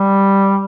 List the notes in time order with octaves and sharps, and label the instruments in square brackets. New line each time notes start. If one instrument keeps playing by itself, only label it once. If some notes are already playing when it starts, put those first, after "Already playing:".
Already playing: [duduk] G3